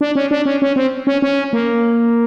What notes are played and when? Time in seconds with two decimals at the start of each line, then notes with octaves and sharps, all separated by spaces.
0.01 D4
0.15 C#4
0.31 D4
0.46 C#4
0.62 C#4
0.76 C4
1.07 C#4
1.22 C#4
1.53 A#3